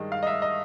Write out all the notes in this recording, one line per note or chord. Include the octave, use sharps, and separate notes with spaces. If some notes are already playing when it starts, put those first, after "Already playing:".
Already playing: G2 D#3 G#3
F5
D#5
E5
D#5